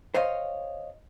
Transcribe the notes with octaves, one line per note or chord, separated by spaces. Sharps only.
C5 C#5 D#5 F5